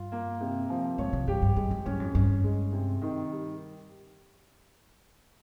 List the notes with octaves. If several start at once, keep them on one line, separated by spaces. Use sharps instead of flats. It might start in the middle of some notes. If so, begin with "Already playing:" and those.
Already playing: G2 F4
A#3
C3
F3
G#2 C#5
C3
G2 G4
G2
G2 G#3
F2
G2 C#4
F2
G2 C#4
G#3
C3
D#3
G3